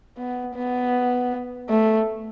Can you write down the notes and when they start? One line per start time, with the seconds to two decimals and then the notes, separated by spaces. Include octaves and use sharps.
0.18 B3
0.55 B3
1.69 A3